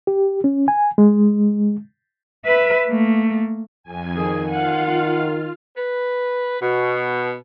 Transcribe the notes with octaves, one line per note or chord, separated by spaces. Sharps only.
G4
C#4
G#5
G#3
B4 E5
A3 A#3
F2 G#5
D#3 G#4
F4 F5 F#5
B4
B2